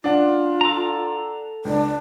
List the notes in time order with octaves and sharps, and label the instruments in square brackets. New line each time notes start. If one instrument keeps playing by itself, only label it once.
[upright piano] D4 F#5 [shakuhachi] F4
[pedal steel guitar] A4 A#5
[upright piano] C#2 [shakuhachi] D4